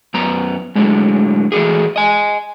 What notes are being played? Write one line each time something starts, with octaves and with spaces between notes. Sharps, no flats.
F#2 B3 A#5
A2 D3 F#3 G#3
E3 G3 A3 F#4 G#4
D#5 G#5